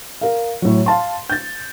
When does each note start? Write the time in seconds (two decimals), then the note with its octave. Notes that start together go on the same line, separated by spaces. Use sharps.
0.21 A#4 F5
0.62 A2 F#3
0.86 F5 A5 C6
1.30 G6 A6